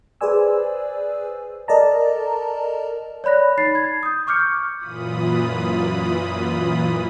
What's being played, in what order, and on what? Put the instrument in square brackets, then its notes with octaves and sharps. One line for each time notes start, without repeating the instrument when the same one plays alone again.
[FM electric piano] G#4 B4 C5 D5 G#5 E6
A4 A#4 D5 D#5 A5 A#5
[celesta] C#5 D5 B5 F#6 A#6
D#4 B5 A6 C7
G#6
D#6 G6
C#6 D6 F6 G6 C#7
[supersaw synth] F#2 A#2 E3 F4 B5 D#6